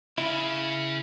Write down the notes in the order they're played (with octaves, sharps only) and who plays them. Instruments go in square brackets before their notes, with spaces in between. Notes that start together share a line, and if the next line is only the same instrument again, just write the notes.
[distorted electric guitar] C#3 [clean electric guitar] E4